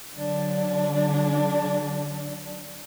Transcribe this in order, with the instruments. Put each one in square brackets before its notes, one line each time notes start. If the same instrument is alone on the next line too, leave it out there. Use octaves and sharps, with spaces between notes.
[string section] D3 F#3 D4